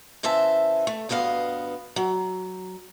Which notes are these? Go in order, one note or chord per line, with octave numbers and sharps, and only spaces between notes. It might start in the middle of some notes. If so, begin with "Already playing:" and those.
C#3 E3 C5 E5 A5
A3
D2 G2 B3 D#5 F5
F#3